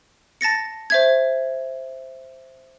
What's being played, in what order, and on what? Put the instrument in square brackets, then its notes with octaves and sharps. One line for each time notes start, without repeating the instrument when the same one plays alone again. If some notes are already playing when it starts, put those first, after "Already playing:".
[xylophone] A5 A6 A#6 C#7
C5 E5 G#6